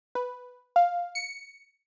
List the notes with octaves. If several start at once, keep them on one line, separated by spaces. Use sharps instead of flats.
B4
F5
C#7